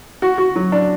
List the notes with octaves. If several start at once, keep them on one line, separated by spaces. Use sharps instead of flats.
F#4
F#4
F#3
D4